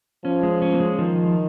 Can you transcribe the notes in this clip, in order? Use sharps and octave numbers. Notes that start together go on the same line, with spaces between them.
F3 C#4
G#3
C#4
A#3
G#3
D#3 F3